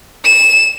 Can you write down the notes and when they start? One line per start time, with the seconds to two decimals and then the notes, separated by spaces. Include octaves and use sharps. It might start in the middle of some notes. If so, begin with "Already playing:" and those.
0.25 E7